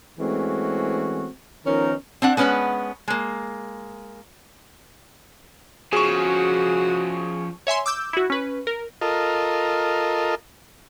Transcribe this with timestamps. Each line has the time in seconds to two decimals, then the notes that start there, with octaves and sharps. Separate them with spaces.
0.19 E3 G#3 A3 C4 C#4 F#4
1.65 D#3 F3 B3 C#4 D#4 A#4
2.22 C4 D4 F#5
2.37 G#3 B3 C#4 B4 F#5
3.08 G#3 A#3
5.93 F3 C#4 F#4 G#4 C#6
7.67 C#5 E5 G#5 C6
7.86 D6 E6 G6
8.13 E4 F#4
8.30 C#4 B4
8.67 A#4
9.01 F4 A4 A#4 D#5